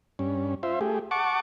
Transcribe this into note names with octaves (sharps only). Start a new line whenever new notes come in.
G2 C#4
F4 C5 E5
A3 G4 G#4
F#5 A5 C#6 D6